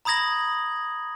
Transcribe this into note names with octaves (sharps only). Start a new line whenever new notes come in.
A#5 B5 D#6 G#6 A#6 F#7